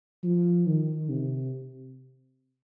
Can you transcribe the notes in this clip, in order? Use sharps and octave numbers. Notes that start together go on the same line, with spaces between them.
F3
D#3
C3